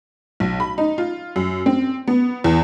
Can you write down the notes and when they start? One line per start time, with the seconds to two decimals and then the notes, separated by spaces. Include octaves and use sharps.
0.40 B1
0.60 B5
0.78 D#4
0.98 F4
1.36 F#2
1.66 C4
2.08 B3
2.44 E2